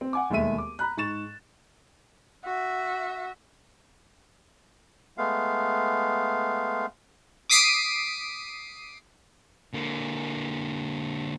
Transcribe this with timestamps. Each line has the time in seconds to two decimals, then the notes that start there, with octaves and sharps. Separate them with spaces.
0.01 C4
0.13 F#5 G#5 D6
0.30 E1 D#2 G#3 A3 E5 D#7
0.58 D6
0.79 A#5 B5 F#6
0.97 G#2 C#6 A6 E7
2.45 F#4 E5
5.18 G#3 A3 B3 F5
7.50 D6 D#6 B6 C7 D7 D#7
9.73 D3 A#3